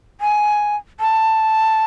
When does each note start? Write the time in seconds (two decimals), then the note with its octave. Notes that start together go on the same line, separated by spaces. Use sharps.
0.21 G#5
1.00 A5